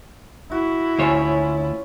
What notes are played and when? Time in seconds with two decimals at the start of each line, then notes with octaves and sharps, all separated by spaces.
0.52 E4 F#4
0.99 D2 C#4 F4 G#4 C5 C#5